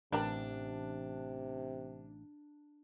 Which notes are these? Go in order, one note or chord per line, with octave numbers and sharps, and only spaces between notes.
A1 C3 D4 G4 A#4 B4